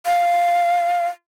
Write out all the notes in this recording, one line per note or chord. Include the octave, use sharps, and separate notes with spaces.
F5